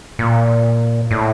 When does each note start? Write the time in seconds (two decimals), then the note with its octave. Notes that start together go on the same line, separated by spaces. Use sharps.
0.19 A#2
1.11 A2